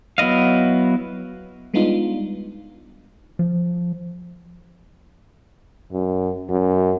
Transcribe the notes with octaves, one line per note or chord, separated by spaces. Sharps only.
F#3 B3 E4 D#5 F5
G3 G#3 B3 D4 D#4 F4
F3
F#2
F#2